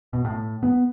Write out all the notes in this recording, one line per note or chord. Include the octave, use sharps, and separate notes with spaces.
B2
A2
B3